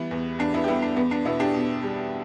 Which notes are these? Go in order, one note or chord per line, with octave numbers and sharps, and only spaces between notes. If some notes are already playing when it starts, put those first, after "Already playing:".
Already playing: E3 G3 B3
E2
E2 D4
B3 E4
G4
G3 B3 E4
D4
E2 B3
D4
B2 B3 E4
D4 G4
B2
G3